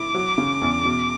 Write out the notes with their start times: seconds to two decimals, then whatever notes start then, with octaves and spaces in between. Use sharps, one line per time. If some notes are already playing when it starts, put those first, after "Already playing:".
Already playing: E4 D6
0.15 F#3
0.38 C#3
0.62 E2
0.85 B2